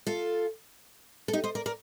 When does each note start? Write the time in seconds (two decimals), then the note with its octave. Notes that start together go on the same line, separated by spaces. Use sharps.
0.07 F4 A4
1.28 A4
1.33 D#4 G4
1.44 C5 D#5
1.55 A#4 D5
1.66 A#4 D5